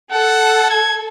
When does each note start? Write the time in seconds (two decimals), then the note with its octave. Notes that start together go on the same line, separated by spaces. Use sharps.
0.12 A4 F#5
0.70 G#6